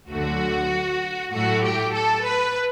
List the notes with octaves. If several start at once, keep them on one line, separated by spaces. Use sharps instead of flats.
D2 D3 F#3 A3 F#4
A2 F#3 A3 F#4
G4
A4
B4